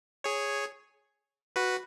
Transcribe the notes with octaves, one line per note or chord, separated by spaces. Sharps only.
G#4 C#5
F#4 B4